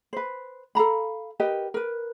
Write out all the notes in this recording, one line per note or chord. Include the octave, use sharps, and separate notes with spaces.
B4 C5
A4 F5 A#5 B5
G4 A#4 B4 D#5
A#4 B4